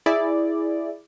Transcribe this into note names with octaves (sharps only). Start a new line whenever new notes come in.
E4 G#4 D5